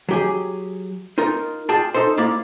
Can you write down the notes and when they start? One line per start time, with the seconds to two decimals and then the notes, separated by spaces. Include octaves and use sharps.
0.09 F#3 G4 G#4
1.18 D#4 F4 A#4
1.69 F4 G#4 D5 G5 A5
1.94 D#4 A4 C5
2.17 A#3 E4 D5 F5